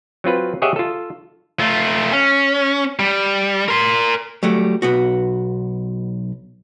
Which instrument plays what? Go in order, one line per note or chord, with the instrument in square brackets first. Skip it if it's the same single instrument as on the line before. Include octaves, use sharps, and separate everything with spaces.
[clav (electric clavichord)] F#3 C4 F4 B4
G4 G#4 C#5 D#5 E5 F#5
F4 A4
[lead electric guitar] A3 F4
C#4
G3
A#4 C6
[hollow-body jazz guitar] F#3 G3 A3
B1 B3 F#4